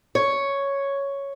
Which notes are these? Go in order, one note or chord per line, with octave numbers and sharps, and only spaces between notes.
C#5